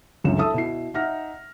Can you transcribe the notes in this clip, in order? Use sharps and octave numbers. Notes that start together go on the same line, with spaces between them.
G1 C#2 F#2 F4 E7
E4 A4 E5 A5 D#6 E6
B2 E4 C7
D#4 E5 F#5 F6 A#6